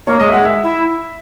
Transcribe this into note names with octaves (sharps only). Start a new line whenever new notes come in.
A#3 C#5
G#3 D#5
E5
G#3 F#5
E5
E4